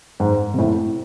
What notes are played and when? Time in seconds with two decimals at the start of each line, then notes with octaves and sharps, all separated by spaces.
0.20 G#2
0.54 C3
0.59 A2